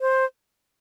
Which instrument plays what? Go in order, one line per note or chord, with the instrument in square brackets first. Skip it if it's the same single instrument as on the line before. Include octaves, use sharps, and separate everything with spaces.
[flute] C5